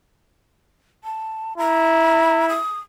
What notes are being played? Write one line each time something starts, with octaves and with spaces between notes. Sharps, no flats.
A5
E4 A#5
D#6